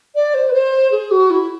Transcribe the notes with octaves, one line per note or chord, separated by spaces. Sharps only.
D5
C5
B4
C5
G#4
F#4
E4